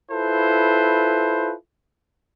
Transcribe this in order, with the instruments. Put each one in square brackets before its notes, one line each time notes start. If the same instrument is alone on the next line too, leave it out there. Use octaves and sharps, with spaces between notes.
[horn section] E4 F4 A4 B4 C5